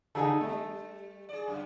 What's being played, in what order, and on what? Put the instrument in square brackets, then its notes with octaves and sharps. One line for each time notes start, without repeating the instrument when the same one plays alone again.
[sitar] C#3 [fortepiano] D#4 G#4 A4
[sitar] G3 [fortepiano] A3
[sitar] G#4 D5
F#2 C#3